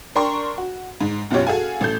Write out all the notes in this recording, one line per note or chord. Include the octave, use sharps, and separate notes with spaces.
D4 A#4 G5 A#5 C6 C#6
F#4
G#2
F#1 B2 F#3 F4 G4 C#5
F#4 G#4 A4 F5 G#5
A1 A4 G6